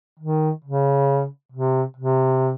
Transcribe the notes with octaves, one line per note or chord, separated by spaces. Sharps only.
D#3
C#3
C3
C3